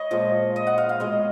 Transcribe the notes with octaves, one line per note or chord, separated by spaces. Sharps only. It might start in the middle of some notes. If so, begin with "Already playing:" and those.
Already playing: C#5 D#5
A#2 F3 G#3
D#5
F#5
F5
F5
B2 G#3 D#5